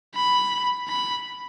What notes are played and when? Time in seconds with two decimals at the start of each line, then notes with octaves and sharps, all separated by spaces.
0.15 B5
0.88 B5